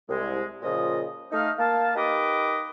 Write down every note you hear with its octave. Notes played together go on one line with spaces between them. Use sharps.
C2 G#3
A#2 C#3 F3 D#5
A3 D#4 F5
A#3 F5 A5
D#4 G4 A#4 B4 D#5 D6